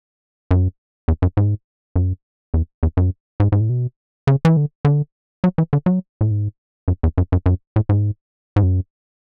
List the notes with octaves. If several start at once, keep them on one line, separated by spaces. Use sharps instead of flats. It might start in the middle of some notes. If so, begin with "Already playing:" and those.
F#2
E2
F#2
G#2
F#2
E2
E2
F#2
G#2
G#2
A2
B2
C#3
E3
D3
D3
F#3
E3
D3
F#3
A2
G#2
F#2
E2
F#2
F#2
F#2
A2
G#2
G#2
F#2